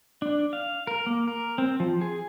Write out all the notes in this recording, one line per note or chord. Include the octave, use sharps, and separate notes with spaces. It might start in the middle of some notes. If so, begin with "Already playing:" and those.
D4
F5
A#4
A#3
A#4
C4
F3
G#4